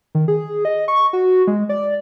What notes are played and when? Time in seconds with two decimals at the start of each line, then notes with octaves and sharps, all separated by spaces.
0.15 D#3
0.28 G#4
0.65 D#5
0.88 C#6
1.13 F#4
1.47 G#3
1.69 D5